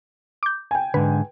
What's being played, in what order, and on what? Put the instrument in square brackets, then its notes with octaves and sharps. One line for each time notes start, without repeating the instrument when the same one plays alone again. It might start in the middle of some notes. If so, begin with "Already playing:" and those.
[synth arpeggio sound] D6 G6
[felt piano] G5 G#5
[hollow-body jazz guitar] G#2 D3 [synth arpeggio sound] B4